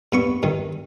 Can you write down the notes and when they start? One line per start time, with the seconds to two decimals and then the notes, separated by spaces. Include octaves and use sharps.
0.12 G2 B3 C#6
0.43 G2 D#3